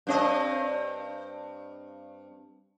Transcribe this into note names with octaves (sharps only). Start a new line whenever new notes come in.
G2 C4 D#5